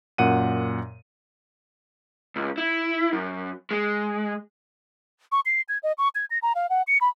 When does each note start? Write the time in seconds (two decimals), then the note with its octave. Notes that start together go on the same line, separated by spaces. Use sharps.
0.18 F#2 A#2 F#5 D#7
2.36 C#2
2.58 E4
3.13 F#2
3.71 G#3
5.32 C#6
5.46 C7
5.69 G#6
5.83 D#5
5.98 C#6
6.15 G#6
6.31 A#6
6.43 A#5
6.55 F5
6.70 F#5
6.88 C#7
7.01 B5